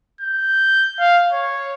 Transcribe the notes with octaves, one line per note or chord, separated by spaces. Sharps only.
G6
F5
C#5